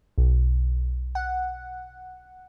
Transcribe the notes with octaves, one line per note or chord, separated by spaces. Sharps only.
B1
F#5